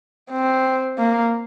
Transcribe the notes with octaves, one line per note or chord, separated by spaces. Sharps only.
C4
A#3